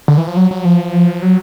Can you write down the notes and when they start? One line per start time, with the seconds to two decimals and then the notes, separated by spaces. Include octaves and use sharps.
0.08 D3
0.18 E3
0.27 F3
0.37 F#3
0.51 F#3
0.65 F3
1.22 F#3